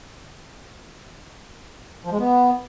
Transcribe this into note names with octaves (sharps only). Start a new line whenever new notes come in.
F3
G#3
B3